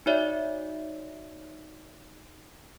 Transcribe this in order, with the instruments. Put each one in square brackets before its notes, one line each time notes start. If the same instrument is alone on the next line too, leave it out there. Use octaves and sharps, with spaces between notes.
[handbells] D#4 F#4 C#5 D5 E5